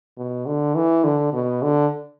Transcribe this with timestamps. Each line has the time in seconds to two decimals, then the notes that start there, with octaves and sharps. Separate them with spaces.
0.17 B2
0.46 D3
0.75 E3
1.04 D3
1.33 B2
1.62 D3